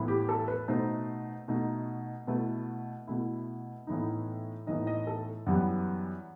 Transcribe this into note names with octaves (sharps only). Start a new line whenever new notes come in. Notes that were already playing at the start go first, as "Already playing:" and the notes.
Already playing: A2 E3 B3 E4
G4
A4
B4
B2 A3 D#4 C5
B2 A3 D#4
B2 A3 E4 B4
B2 A3 E4
A2 E3 B3 D#4
A2 E3 B3 D#4 D#5
D#5
A4
F#2 E3 G3 B3 F#5